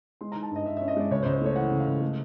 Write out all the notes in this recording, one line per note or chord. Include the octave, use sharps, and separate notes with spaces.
G#3 C6
D#3 A#5
A5
G2 D#5
G2 E5
C#4 E5
D#5
G#3 D5
C#2 C#5
C5
C#2
C5
A3 C#5
E3 F#5
C#3
F5
C#2
A3